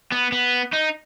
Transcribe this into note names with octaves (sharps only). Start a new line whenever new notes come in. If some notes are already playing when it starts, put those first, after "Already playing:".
B3
B3
D#4